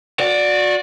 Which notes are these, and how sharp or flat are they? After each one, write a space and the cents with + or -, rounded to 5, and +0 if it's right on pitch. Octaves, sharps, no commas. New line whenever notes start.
F#4 -30 D5 +0